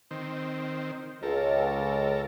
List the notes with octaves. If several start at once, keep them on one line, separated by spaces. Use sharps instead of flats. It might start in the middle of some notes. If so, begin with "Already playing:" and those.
D#3 C4
C#2 A4 A#4